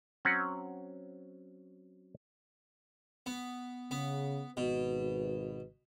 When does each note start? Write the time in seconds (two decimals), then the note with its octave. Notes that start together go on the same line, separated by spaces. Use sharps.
0.25 F#3 C4 C#4 F#5
3.26 B3
3.91 C#3 B3
4.57 G#1 B2 B4